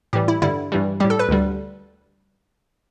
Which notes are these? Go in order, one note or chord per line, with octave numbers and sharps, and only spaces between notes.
A2 E3 G3 G4
E4
G2 D3 G3 E4
G2 E3 G3
A2 G3 G4
A4
B4
D2 D3 G3